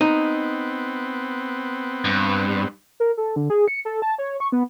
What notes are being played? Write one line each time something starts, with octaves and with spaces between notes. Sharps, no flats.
B3 C4 D#4
G2
A#4
A4
D3
G#4
C#7
A4
A5
C#5
C#6
B3